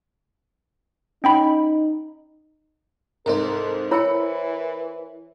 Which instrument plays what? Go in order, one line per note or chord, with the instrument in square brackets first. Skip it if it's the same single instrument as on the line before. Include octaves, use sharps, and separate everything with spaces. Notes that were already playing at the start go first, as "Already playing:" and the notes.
[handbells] C#4 G5 B5 [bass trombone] D#4
[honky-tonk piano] C2 G#2 [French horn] A4 [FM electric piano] A#4 C5
[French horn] E3 [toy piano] E4 C#5 E6 [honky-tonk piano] B5 C#7